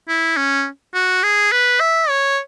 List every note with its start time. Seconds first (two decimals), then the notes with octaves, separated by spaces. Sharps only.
0.08 E4
0.37 C#4
0.94 F#4
1.23 G#4
1.52 B4
1.80 E5
2.09 C#5